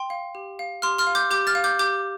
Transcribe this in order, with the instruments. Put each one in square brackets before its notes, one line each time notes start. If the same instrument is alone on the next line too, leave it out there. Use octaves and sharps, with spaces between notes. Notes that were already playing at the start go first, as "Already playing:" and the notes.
Already playing: [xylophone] G5 C6
F5
G4
F5
G4 C6 F6
C6 F6
F5
D6 G6
G4 D6 G6
F6 A6
F5
D6 G6
G4 D6 G6